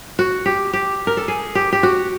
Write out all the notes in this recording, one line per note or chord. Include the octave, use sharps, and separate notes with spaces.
F#4
G4
G4
A#4
A4
G#4
G4
G4
F#4